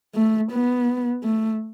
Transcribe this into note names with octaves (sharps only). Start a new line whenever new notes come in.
A3
B3
A3